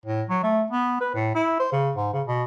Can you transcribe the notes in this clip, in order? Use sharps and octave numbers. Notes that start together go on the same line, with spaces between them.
A2
F#3
A3
B3
B4
A2
E4
C5
C#3
G#2
C#3
B2